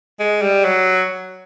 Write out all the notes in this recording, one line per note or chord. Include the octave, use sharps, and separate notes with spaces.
G#3
G3
F#3